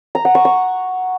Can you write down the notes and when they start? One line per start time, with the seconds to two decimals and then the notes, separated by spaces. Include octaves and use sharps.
0.15 A#5
0.25 F#5
0.35 C#6
0.45 C#6